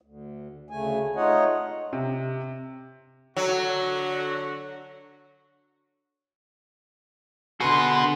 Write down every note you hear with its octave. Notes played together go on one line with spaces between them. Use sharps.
D2
D2 C#3 A3 G#5
A3 D#4 F4 C#5 D#5 F#5
C3
D3 F#3 F#4
D3 F#4 G#4 B4 C6